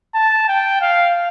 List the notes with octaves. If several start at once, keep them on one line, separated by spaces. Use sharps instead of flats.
A5
G5
F5